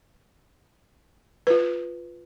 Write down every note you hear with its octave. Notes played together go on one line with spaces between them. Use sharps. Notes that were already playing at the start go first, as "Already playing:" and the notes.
F4 B4